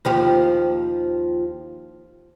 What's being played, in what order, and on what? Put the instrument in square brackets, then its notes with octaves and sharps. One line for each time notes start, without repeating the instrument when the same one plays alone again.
[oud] D#2 F3 G4